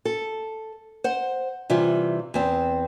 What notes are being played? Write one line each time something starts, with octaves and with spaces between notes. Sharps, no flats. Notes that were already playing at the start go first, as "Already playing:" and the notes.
A4
C5 F#5
C3 E3 G3 F4
E2 C4